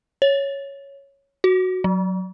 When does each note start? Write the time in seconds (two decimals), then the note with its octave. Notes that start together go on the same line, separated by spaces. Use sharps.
0.22 C#5
1.44 F#4
1.84 F#3